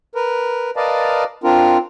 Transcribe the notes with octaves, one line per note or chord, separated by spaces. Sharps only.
A#4 B4
A#4 B4 D5 D#5 F5 A5
C4 D4 F4 A#4